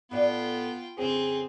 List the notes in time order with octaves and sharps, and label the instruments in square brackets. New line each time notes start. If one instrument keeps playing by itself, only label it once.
[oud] A2 D5 [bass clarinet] B3 [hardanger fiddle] F4 G5
[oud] F2 C#3 [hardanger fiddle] C4 [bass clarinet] G#4